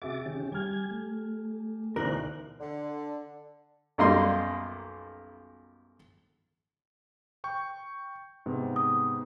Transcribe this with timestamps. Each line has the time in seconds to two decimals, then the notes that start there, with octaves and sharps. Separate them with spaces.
0.02 C3 F#4 G#4 E5 D6 A6
0.26 D#3 C#4 G4
0.52 G3 G4 G#5 F6 G#6
0.91 A3
1.96 D2 B2 E3 D#4 A#4 C5 D5 F#6
2.60 D3
3.98 B1 F#2 G3 A#3 D#5 C6
7.44 G5 C#6 G6
8.46 G#2 C3 B3
8.76 D#6